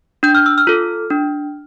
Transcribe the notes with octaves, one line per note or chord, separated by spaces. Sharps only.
D4 G6
F6
E6
F6
F4 A4
D4